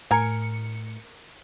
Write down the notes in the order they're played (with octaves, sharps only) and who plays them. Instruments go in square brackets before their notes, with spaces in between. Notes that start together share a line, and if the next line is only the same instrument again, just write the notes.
[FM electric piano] A2 C#7 [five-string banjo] A#4 G#5